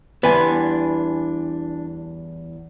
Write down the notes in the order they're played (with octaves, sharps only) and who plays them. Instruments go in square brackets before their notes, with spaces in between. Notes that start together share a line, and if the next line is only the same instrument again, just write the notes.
[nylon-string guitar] E2 G3 [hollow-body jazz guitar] B3 [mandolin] D4 G#5 C6